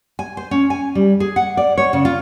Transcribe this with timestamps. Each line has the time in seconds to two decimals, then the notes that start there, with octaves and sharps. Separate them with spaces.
0.19 G#5
0.37 C5
0.51 C#4
0.70 G#5
0.95 G3
1.20 G#4
1.36 F#5
1.57 D5
1.78 C#5
1.93 C#3
2.05 F4